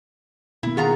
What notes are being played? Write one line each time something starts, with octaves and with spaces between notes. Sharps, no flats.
B2 D#3 A#3 E4
D#3 F4 G#4 F#5 A#5